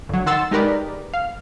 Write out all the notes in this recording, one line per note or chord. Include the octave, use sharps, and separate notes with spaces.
G1 F#3
D#3 F#5 C6 E6 A6
G#3 D#4 G4 A#4 B4 D5
F5